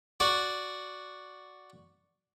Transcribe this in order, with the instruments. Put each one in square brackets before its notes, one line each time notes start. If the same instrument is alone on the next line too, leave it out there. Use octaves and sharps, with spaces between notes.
[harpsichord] F#4 D5